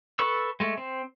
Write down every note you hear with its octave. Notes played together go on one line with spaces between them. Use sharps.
A4 B4 C#6 E6
G#3 A3
C4